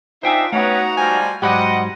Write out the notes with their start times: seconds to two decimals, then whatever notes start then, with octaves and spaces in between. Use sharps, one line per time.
0.23 D4 D#4 F4 C5 E5 G5 G#5
0.52 A3 B3 C#4 D#4 F#4 B4 F#5 A#5
0.97 F3 G3 F4 G#5
1.42 G#2 F#3 G3 G4 C5 D#5 F#5 B5